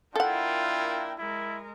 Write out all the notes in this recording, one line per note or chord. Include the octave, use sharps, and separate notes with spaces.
A#3 D4 E4 F4 A4 A#4 F#5 G5
G#3 E4 A#4